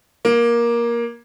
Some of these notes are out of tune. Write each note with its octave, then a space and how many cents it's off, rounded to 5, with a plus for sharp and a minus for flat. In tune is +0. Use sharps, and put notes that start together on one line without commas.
A#3 +15